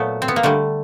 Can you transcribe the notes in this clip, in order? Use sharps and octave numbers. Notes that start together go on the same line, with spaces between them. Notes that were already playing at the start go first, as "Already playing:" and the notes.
Already playing: A#2 F#3 A3 B3
C4
B3
A#3
D3 G3 A3